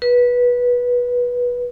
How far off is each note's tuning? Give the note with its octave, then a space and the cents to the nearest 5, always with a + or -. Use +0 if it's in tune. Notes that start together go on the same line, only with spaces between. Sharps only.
B4 -15